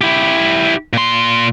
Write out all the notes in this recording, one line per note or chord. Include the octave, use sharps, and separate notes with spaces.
E4 G4
A#2 C6